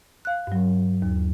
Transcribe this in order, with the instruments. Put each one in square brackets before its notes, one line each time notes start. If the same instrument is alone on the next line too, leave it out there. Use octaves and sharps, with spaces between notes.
[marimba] F5 F#6
G2 F#3
D#2